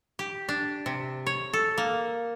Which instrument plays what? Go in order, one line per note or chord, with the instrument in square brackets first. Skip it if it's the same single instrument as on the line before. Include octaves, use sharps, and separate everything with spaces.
[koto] G4
D4
C3
C#5
A4
A#3